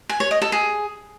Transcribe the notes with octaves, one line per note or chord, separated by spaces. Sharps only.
G#5
C#5
D#5
A4
G#4